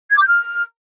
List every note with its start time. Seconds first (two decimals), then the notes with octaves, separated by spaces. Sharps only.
0.10 G#6
0.16 D6
0.21 G6
0.27 F6